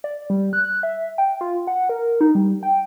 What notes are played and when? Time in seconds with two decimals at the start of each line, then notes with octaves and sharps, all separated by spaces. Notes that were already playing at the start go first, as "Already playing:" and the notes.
0.04 D5
0.30 G3
0.53 F#6
0.83 E5
1.18 G5
1.41 F4
1.67 F#5
1.89 A#4
2.21 D#4
2.35 G3
2.63 G5